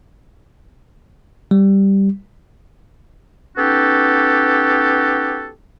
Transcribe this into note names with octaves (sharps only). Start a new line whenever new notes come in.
G3
B3 C#4 D#4 F#4 G4 A4